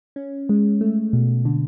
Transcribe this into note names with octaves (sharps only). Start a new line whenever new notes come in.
C#4
G#3
A3
B2
D3